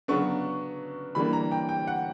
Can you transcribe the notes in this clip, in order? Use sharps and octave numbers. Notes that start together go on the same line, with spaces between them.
C#3 F#3 B3 D4 C#6
E3 G3 A#3 D4 B5
A#5
G5
G5
F#5